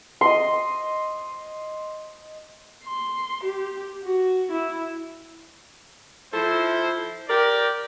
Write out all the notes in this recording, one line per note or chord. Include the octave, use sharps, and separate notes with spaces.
D#5 C6
C6
G4
F#4
E4
F3 E4 A4 C5
G4 A#4 D5